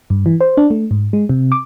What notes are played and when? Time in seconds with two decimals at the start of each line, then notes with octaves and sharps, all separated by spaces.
0.10 G2
0.26 E3
0.41 C5
0.57 D4
0.70 A3
0.91 G#2
1.13 G#3
1.29 C3
1.52 D6